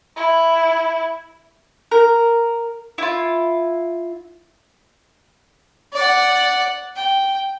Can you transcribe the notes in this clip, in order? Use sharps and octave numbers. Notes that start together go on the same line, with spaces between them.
E4
A#4
E4 F4
D5 F#5
G5